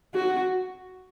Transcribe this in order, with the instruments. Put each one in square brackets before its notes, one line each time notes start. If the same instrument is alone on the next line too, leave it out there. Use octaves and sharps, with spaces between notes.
[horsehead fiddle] F#4